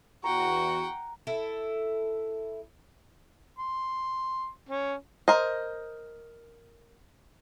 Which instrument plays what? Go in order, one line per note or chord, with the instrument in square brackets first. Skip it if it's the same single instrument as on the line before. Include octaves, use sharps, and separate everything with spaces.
[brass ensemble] E2 F#4 [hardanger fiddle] F#5 G5 [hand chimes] A#5 [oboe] C#6
[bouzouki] E4 A4
[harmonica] C6
C#4
[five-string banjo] A#4 C5 D#5